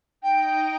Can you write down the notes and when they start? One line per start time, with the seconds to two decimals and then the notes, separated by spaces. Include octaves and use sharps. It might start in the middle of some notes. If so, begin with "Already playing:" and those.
0.21 D#4 D#5 G5